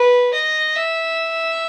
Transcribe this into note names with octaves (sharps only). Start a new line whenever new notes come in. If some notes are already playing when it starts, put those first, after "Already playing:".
Already playing: B4
D#5
E5